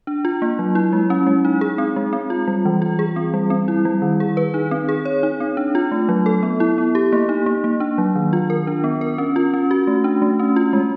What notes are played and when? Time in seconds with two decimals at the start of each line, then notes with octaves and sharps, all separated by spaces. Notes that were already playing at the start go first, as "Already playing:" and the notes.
0.07 D4
0.25 F4
0.42 A#3
0.59 F#3
0.75 E4
0.93 G#3
1.10 C#4
1.27 G#3
1.45 D#4
1.61 G#4
1.78 C4
1.96 G#3
2.13 C4
2.30 F4
2.47 G3
2.65 E3
2.82 F4
2.99 G#4
3.16 C4
3.34 G3
3.50 C4
3.68 E4
3.85 G3
4.02 D#3
4.20 G#4
4.37 B4
4.54 D#4
4.71 C4
4.89 G#4
5.05 C#5
5.23 D#4
5.40 C4
5.57 D4
5.75 F4
5.91 A3
6.09 F#3
6.26 A4
6.43 B3
6.60 E4
6.78 B3
6.95 G4
7.13 A#3
7.29 D#4
7.46 A#3
7.64 A#3
7.80 D4
7.98 F#3
8.15 D#3
8.33 F4
8.50 A#4
8.67 D4
8.84 B3
9.01 A#4
9.18 C#4
9.36 F4
9.54 C#4
9.71 F#4
9.87 A3
10.04 D4
10.22 A3
10.39 C#4
10.56 F4
10.73 G#3